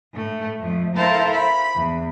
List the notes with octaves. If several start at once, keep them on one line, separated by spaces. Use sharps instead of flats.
A2 A3
F2 F3 A3
E4 A4 A#4 C5 F5 A5
B5
E2